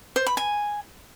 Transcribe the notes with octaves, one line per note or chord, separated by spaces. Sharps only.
C5
B5
G#5